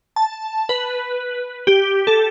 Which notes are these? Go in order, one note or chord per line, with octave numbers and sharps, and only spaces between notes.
A5
B4
G4
A4